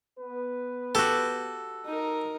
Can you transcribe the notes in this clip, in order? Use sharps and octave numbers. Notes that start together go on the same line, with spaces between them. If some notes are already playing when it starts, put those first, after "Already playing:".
B3 B4
F#4 G4 A4
D#4 A#4